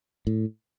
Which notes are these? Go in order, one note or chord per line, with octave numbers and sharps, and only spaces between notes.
A2